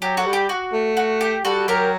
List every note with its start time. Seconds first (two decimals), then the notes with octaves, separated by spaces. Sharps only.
0.02 F#3 G4
0.17 F#4 A4
0.26 G3
0.33 G4
0.49 F#4
0.73 A3
0.97 F#4
1.21 G4
1.45 G3 F#4 A4
1.68 F#3 G4 A#4